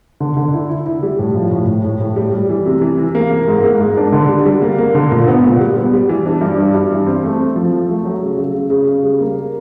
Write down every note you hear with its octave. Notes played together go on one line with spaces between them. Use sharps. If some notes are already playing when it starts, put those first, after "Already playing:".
D3
D3
E4
E4
E4
G3
A2
F3
A2
A2
A2
A2
G3
G3
E3
C3
E3
E3
A#3
A#3
G#2
A#3
G#2
D4
D3
G3
G3
A#3
A#3
D3
A#2
B3
A#2
G3
B3
G3
E3
D4
G2
D4
G2
E3
C4
A3
C4
F3
F3
A3
F#3
C#3
C#3
C#3
C#3
C#3
G3
A#3